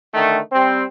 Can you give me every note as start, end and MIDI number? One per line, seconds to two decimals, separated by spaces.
0.14 0.39 50
0.14 0.39 51
0.14 0.39 57
0.52 0.83 55
0.52 0.83 60